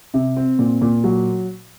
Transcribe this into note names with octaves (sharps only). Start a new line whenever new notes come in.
C3
C4
A#2
A#2
F#3